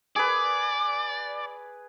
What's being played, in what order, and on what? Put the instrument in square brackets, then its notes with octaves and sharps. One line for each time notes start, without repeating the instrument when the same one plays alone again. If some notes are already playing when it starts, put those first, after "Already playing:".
[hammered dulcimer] G#4 B4 [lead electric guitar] D5